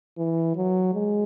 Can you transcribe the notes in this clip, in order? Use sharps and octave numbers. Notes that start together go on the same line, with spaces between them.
E3
F#3
G#3